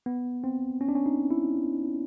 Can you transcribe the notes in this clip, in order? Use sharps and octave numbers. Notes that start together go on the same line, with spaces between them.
B3
C4
C#4
D4
C#4
D#4
E4